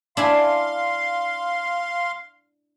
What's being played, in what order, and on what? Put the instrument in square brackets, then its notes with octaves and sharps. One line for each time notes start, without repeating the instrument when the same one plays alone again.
[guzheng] D4 E4 G#5 [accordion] F5 C6